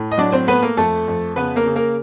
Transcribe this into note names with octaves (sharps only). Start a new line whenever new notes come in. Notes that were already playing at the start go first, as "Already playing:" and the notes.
Already playing: A2 A3
D#5
F#3 D4 D5
C4 C5
A3 B3 B4
A#3 A#4
F2 A3 A4
F2
C#3 B3 B4
A#3 A#4
C#3
A#3 A#4